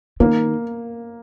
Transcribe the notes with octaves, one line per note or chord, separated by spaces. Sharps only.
D#3 A#3